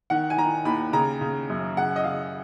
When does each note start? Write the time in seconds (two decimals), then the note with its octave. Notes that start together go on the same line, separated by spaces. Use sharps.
0.10 D#3 F#5
0.30 G#5
0.38 D#3 A#5
0.65 D#2 B5
0.93 C#3 A#5
1.21 C#3
1.50 F#2
1.76 C#3 F#5
1.96 D#5
2.04 C#3 F5